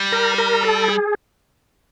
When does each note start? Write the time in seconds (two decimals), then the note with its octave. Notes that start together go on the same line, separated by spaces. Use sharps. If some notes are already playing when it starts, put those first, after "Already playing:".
Already playing: G3
0.12 A#4
0.38 A#4
0.63 A4
0.88 G#4